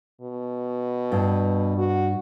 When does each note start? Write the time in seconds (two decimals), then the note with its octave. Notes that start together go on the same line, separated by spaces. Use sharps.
0.21 B2
1.12 G2
1.78 F#4